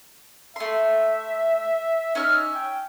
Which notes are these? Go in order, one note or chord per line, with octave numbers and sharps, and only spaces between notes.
A3 E5 C6
C#4 D#4 E5 F6
G5